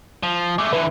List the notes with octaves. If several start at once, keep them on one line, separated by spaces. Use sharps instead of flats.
F3
G#3 A3 D6
D3 E3 B4